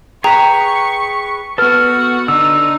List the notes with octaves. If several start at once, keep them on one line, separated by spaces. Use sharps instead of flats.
G#4 B4 G5 A#5 C#6
B3 F#4 A4 B4 F6
D3 D#4 E6